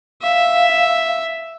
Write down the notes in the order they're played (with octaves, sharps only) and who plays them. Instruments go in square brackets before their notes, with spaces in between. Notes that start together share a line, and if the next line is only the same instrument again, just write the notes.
[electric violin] E5 [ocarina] F5